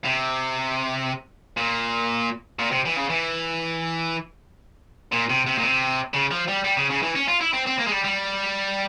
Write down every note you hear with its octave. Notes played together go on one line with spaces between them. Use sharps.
C3
A#2
A#2
C3
E3
C#3
E3
A#2
C3
C3
A#2
C3
C#3
F3
G3
G3
C#3
C#3
E3
C#4
F4
E4
C4
C4
A#3
G#3
G3
G3